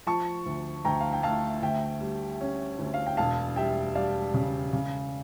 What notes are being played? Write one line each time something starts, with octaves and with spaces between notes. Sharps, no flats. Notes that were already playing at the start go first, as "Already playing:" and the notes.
F3 A5 C#6
D2
D2 G5 A#5
F5
G5
A3 F5 A5
D2 E5 G5
G3
C#4
D2
F5
G5
E1 F5 A5
G3 E5 G5
G3 D5 F5
C#3
C#3